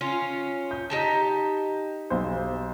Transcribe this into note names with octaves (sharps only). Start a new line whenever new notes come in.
C#4 F4
G6
D#4 G4 A5
B1 C5